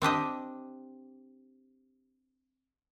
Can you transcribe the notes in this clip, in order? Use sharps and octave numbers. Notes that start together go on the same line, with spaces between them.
C4 D4 G4 D#5